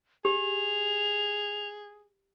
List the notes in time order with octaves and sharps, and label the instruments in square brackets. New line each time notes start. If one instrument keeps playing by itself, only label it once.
[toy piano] G4 [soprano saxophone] G#4 [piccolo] F7